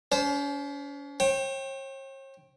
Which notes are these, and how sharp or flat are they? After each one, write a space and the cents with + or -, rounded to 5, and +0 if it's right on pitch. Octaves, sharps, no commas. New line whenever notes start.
C#4 +40 C5 +0
C#5 -45 G5 +0